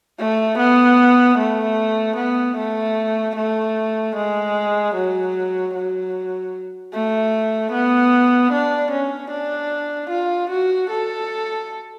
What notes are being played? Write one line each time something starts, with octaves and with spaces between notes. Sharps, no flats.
A3
B3
A3
B3
A3
A3
G#3
F#3
F#3
A3
B3
D4
C#4
D4
F4
F#4
A4